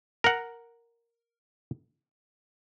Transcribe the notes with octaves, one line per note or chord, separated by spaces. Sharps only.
A#4 F#5